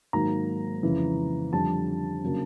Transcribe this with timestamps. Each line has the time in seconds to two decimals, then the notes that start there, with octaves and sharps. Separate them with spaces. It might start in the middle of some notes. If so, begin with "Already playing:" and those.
0.13 G#2 D#3 F#3 A#3 A#5
0.83 F2 C#3 E3
1.52 F2 D3 G3 A5
2.24 C#3 F#3 A#3 D4